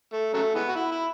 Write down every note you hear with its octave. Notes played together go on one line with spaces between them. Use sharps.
A3
C#3 F#3 A3
E3 G#3 B3
F#4
E4
E4